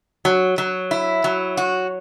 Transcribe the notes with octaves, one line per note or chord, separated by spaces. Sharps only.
F#3
F#3
E4
F#3
F#4